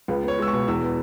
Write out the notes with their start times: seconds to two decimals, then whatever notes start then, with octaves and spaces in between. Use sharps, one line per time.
0.08 C#2 B4
0.23 B3 C#5
0.38 G#3 E6
0.47 C#6
0.53 B2
0.68 E2 E6
0.82 B3